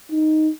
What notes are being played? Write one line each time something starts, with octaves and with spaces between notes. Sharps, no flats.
D#4